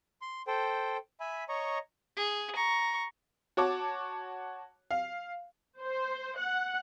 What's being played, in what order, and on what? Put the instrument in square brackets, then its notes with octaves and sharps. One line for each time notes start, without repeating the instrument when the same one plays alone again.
[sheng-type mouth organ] C6
A4 C5 G5
E5 G#5 B5
C#5 D#5 A#5 C#6
[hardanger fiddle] G#4
A#5 C#6
[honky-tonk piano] F#4 C#5 A5 D6
F5
[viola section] C5
F#5